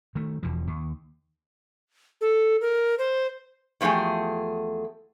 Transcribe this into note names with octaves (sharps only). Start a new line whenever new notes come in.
D#3 A3
E1 E2 B2 F3
D#2
A4
A#4
C5
E2 F3 A3 G4 G#4